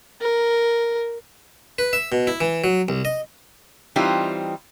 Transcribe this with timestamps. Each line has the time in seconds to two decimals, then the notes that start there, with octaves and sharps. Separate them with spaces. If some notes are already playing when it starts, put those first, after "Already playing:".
0.21 A#4
1.79 B4
1.93 E5
2.12 B2
2.27 E4
2.41 E3
2.64 F#3
2.89 C2
3.05 D#5
3.96 E3 G3 C4 D#4 F4